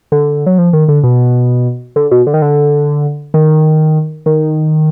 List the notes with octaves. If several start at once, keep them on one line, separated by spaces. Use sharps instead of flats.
D3
F#3
F3
D#3
D3
B2
D3
B2
D3
D#3
D3
D#3
D#3